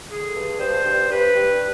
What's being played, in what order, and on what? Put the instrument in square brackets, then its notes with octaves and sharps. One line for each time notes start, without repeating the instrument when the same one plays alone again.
[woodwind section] D3 G#4
G2
G2 C5
G2
G2 B4
G2